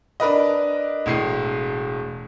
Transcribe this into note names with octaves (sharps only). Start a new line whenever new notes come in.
D4 A#4 B4 D#5
E1 A2 C7